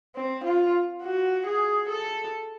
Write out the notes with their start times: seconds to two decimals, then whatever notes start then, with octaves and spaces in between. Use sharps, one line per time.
0.15 C4
0.43 F4
1.02 F#4
1.46 G#4
1.88 A4